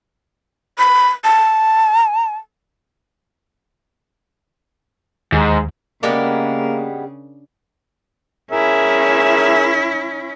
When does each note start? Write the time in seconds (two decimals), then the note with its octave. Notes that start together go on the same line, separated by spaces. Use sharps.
0.78 B5
1.24 A5
5.32 D#2 G#2
6.03 C#3 G3 G#3 A#3 B3 D4 A#4
8.52 C#4 E4 G#4 A#4 E5